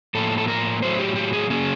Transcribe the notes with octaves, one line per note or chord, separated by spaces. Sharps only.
A2 F3 A#3 A4
A4
A#4
A2 F#3 A3 C5
G4
G4
G#4
C#3 F#3 A#3 C#4 G#4